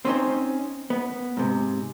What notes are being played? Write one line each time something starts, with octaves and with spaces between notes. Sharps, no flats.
C4 C#4 D#4 C5
B3
G#2 C3